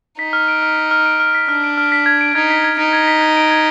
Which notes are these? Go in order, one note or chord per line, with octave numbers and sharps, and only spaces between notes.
D#4 B6
F6
D7
F6
B6
F6
D7
F6
B6
D4 F6
D7
F6
B6
G#6
D7
D#4 G#6
B6
G#6
D#4 D7
G#6
B6
G#6
D7
G#6